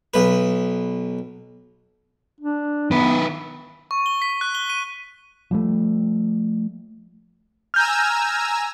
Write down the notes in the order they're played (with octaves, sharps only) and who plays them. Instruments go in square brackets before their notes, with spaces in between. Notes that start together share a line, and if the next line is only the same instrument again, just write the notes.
[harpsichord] B1 B4
[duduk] D4
[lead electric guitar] D#3 B4 [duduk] B3
[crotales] C#6
G7
B6
F#6
G7
D#7
[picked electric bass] F3 G3 A3
[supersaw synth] G#5 A#5 E6 [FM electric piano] F6 G6